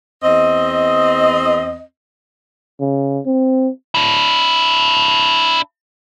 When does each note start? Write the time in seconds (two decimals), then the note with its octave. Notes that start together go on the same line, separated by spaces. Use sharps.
0.23 E2 C4 D#5
2.81 C#3
3.26 C4
3.95 D4 E4